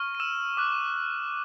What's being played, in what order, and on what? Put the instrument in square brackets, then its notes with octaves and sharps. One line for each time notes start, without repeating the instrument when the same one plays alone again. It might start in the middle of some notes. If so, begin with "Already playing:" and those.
Already playing: [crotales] C#6 F6
D#7
E6 E7
D6 F#6